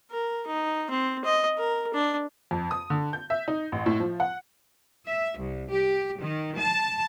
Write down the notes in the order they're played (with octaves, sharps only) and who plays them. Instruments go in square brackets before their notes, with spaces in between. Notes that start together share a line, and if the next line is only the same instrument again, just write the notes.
[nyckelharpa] A#4
D#4
C4
D#5
A#4
D4
[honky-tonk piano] F2
D#6
D3
G6
E5
D#4
A1
A2
F3
F#5
[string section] E5
C2
G4
D#3
A5